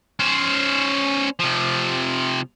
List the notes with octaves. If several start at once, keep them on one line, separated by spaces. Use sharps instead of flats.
C#4 C5
C3 F3